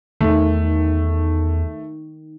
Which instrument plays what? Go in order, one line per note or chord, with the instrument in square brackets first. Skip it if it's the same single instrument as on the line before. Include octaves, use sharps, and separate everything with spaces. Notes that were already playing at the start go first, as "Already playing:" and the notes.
[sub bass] E2 [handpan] D#3 [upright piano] A3